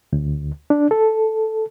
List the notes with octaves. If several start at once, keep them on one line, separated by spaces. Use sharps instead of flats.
D2
D4
A4